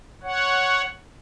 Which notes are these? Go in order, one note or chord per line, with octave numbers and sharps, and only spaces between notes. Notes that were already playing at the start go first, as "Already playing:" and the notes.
C#5 F#5